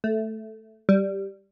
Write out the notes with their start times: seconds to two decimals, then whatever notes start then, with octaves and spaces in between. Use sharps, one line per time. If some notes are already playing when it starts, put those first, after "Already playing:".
0.04 A3
0.89 G3